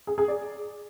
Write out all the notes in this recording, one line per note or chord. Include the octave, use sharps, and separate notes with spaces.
G#4
G#4
D5